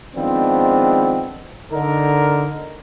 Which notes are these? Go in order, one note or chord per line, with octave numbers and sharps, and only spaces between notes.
D#3 F3 G#3 B3 C4 D4
D3 D#4 A#4